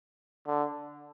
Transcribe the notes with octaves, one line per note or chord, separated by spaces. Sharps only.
D3